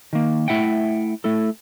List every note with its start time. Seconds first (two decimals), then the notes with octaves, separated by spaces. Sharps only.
0.13 D#3 A#3
0.48 A3 E4 E5 F#5 G5
1.24 A3 E4 A4